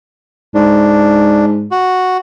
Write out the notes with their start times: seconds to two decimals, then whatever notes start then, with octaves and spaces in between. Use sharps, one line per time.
0.55 G#2 D4
1.71 F#4